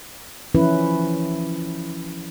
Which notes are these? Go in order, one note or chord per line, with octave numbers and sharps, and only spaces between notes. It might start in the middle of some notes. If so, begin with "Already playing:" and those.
E3 F3 C#4 E4 B4